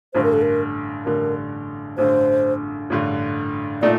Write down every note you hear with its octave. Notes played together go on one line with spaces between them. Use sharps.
A1 G2 D3 C5
A#4
A4
A#4
A1 G2 D3 A#4
A1 G2 D3 C5
A1 G2 D3
A#2 A3 D#4 D5